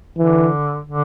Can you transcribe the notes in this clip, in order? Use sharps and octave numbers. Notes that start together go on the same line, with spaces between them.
D3 E3
D3